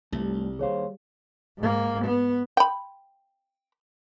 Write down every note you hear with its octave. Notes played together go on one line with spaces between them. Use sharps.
C2 G2 G3 A3
D#2 G#4 C5 C#5 F5
G#2 A#3
B3
G5 B5